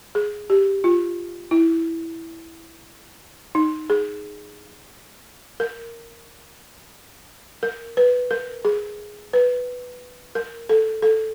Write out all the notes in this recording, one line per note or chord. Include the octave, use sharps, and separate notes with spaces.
G#4
G4
F4
E4
D#4
G#4
A#4
A#4
B4
A#4
G#4
B4
A#4
A4
A4